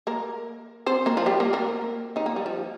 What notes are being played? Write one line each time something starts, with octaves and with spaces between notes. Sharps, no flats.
A#3 A#4
C4 C5
A#3 A#4
F3 F4
G3 G4
A#3 A#4
A#3 A#4
D#3 D#4
A#3
G3
F3